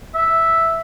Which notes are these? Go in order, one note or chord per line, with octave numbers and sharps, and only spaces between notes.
E5